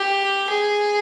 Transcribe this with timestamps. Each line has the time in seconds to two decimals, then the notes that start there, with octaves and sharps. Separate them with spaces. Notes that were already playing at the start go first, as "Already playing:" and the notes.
Already playing: G4
0.50 G#4